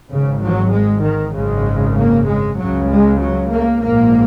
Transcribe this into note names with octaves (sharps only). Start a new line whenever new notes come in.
G#1 G#2 C#3
F#3
G#3
D#3
G#1 F#2 C#3 G#3
A#3
G#3
C#2 C#3 F#3
G#3
F#3
A#3
A#1 G#2 A#3